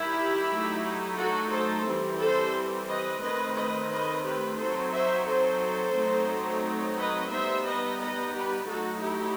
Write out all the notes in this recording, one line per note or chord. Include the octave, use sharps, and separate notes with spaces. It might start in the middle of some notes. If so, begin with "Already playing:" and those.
Already playing: D#3 G3 D#4 E4 G4
F#3 A3 D#4
F#4 A4
A4 C5
E3 G3 C4
A4 C5
B4 D#5
D#3 A3 C4 B4 D#5
B4 D#5
B4 D#5
G4 B4
F#3 C4 D#4 A4 C5
C5 E5
A4 C5
F#3 A3 C4 D#4
B4 D#5
G3 B3 D#4 C5 E5
B4 D#5
B4 D#5
G4 B4
F#3 A3 D#4 F#4 A4
E4 G4